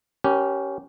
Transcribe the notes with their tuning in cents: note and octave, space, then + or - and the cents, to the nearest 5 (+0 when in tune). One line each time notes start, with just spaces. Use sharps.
C#4 +0 G4 -20 A#4 +30